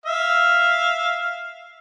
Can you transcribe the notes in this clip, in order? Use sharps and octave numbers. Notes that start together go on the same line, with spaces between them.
E5 F5